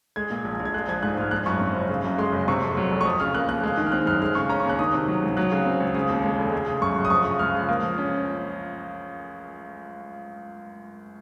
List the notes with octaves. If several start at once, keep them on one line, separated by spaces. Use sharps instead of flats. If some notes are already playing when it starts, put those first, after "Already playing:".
G#3 G#6
A#2
A#1
A#1
G#6
G#3 F#6
F3 G#6
G#2 F#6
G#2 F6
F3 F#6
F#2 C#6
C4
F#1
C#3
F#2
G#3 C6
F#1
C3 C#6
F2
F#3
F1
C#6
F3 D#6
C#3 F6
A#3 F#6
D#2 F#6
G#3 F#6
D#3
F6
C4 F#6
F#2 F6
G#3 F6
C#3 C#6
C#4 A#5
D#2 C#6
F#6
D#3 D#6
C3
F#3
C#2
F#3 F#6
C#3
C4
C#2
C#3 D#6
D#2
G#3
F1
G#3
C#3
F#2 C#6
F#2
D#6
F3 C#6
C#3
C#2 F6
C#2
A#3
F3
C#4